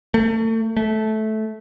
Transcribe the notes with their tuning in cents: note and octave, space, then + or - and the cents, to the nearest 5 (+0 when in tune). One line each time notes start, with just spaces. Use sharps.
A3 +35
A3 -15